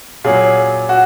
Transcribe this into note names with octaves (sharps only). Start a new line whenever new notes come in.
A#2 F#3 C#4 G#4
F#4